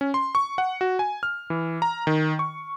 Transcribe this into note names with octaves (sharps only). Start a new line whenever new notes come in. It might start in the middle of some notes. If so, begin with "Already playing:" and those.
C#4
C6
C#6
F#5
F#4
G#5
F6
E3
A#5
D#3
C#6